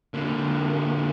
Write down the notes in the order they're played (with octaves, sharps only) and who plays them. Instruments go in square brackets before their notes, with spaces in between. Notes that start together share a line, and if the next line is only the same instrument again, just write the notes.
[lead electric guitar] D3 A#3